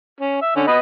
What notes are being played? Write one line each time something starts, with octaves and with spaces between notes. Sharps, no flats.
C#4
E5
D3 C#4
B3 B4 D#5